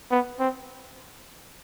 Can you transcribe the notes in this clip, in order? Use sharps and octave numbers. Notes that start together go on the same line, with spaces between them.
B3
C4